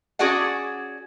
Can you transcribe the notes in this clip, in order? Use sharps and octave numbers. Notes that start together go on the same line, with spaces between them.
C#4 F#4 G#4 D5 F#5